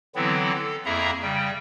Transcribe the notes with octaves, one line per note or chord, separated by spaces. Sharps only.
D3 E3 F#3 B3 C4 E4
A4
F2 A#3 E4 G#4 E5 A#5
C#3 G3 G5